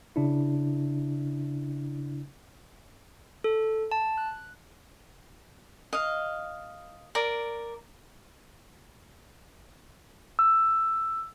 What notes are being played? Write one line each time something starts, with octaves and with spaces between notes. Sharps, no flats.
C#3 D4 E4
A4
A5
F#6
D#5 F5
A#4 D5
E6